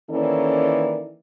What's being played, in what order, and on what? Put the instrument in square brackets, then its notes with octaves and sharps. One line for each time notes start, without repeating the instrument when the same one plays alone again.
[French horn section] D#3 E3 A#3 C#4 A4 D5